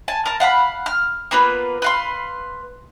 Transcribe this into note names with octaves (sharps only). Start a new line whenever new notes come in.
G#5 A5
A#4 A5
F5 F#5 A5 B5
F6
A#3 B3 F4 B4
B4 F5 C6